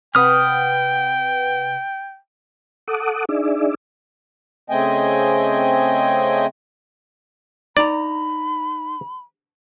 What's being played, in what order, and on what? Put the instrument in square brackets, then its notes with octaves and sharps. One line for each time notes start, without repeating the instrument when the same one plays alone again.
[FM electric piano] C3 B4 F#5 [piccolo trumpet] G5 [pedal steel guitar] D#6 F6
[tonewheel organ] A4 F#5 D6 D#6
D4 D#4 G#4 D5 E5
[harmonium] C#3 A3 C4 D#5 G5 G#5
[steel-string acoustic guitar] D#4 A#5 [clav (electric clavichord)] D5 [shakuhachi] B5